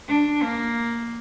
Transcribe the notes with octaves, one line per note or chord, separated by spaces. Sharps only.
D4
A#3